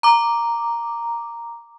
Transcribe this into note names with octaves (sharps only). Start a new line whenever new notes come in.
A#5 D6